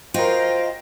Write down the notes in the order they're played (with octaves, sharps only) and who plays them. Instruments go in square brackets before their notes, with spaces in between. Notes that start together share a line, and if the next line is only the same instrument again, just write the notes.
[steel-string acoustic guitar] F4 [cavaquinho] F#4 A#4 [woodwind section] C5 G5 [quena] D#5